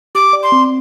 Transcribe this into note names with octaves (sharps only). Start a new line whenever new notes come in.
G4 D6
D5
C6
C4